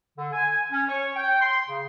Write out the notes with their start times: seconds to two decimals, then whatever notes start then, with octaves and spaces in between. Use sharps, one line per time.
0.18 D3
0.33 G#5
0.72 C#4
0.89 C#5
1.16 G5
1.41 C6
1.67 C#3